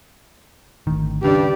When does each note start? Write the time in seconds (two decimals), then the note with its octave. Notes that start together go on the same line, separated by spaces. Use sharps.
0.87 G#1 D2 D#3
1.22 G2 C#3 G4 D5